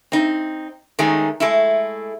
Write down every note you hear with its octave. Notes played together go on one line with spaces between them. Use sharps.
C4 D#4
D#3 G#3 A3 C#4 D#4 G#4
G#3 A3 E4